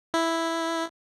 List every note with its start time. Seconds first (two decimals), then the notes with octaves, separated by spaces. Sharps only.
0.14 E4